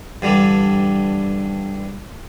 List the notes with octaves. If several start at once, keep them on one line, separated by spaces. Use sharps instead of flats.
G2 D3 E3 G3